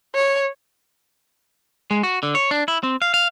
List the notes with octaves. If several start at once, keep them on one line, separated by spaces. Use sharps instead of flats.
C#5
G#3
F#4
D3
C#5
D4
E4
C4
F5
F5